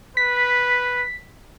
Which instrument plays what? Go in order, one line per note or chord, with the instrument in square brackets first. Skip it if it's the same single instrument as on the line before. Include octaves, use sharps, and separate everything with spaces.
[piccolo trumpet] B4 [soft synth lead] B6